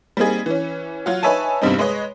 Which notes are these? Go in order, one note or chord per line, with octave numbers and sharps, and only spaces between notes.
G3 A#3 C4 D#4 G#4
E3 C#4
F#3 F4 F#4
D#4 B4 C#5 E5 G#5 A5
E2 G2 C3 G3 C4 D#4
G#3 B4 C#5 D#5